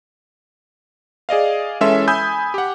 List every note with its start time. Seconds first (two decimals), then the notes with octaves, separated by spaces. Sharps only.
1.29 G#4 D5 D#5 F5
1.81 E3 G#3 C#4 A4 E5 C6
2.08 G#5 B5 D#6 E6 G6
2.54 G4 F#5